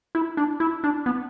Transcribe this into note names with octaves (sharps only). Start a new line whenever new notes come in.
E4
D4
E4
D4
B3